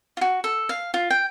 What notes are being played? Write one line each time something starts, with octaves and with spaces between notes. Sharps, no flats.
F4 F#4
A4
F5
F4
G5